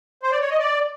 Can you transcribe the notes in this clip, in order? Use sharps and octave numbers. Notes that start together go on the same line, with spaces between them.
C5
D5
C#5
D#5
D5